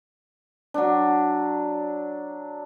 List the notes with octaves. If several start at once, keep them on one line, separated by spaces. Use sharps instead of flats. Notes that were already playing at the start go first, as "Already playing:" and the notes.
F#3 D4